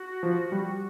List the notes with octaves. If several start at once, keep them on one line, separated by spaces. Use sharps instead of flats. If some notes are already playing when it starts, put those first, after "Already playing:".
Already playing: F#4
F3
G3